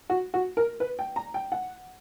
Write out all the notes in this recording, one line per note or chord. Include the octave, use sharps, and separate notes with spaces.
F#4
F#4
A#4
B4
G5
A#5
G5
F#5